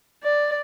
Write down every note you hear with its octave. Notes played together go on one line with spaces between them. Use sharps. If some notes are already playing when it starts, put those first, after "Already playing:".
D5